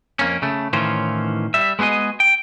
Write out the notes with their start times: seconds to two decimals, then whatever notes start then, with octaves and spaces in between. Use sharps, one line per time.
0.19 F2 A#3 C#4
0.42 C#3 A3
0.73 A2 D#3 E3 C#4 F4 C5
1.54 G3 E5
1.79 G#3 B3 F#4 G#4 D#5
2.20 G5